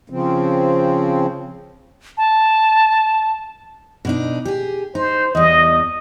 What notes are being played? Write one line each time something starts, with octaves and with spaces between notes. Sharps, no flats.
C#3 F3 C4
A5
B2 D4 D#4
G4 G#4
D#4 C5
E2 G3 D#5